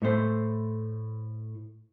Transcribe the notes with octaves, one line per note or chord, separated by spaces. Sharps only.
A2 A3 C5